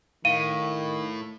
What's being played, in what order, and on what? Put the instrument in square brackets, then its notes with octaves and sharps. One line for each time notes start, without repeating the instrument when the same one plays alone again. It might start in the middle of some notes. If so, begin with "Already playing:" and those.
[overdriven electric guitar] A2 [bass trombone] D#3 [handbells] F5 [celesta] D#7